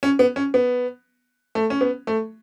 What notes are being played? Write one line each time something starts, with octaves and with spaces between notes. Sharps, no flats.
C#4
B3
C#4
B3
A3
C#4
B3
A3